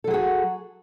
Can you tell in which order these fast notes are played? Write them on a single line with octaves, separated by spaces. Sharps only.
A4 F#3 G#4 F#4